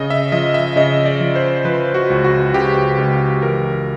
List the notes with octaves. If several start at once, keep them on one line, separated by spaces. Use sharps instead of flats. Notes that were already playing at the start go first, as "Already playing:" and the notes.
Already playing: C#3 D#5
E5
F3 D#5
E5
C#3 D#5
D5
F3
C5
F3 B4
F#4
C#2
F#4
C#3 G4
C#2
E3 A#4